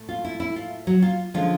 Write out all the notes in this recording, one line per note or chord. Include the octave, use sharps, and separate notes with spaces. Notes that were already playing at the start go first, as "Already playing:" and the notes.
Already playing: A2 A3
F4
E4
E4
F4
F#3 F#4
F4
D3 F3 G#3 C#4 F4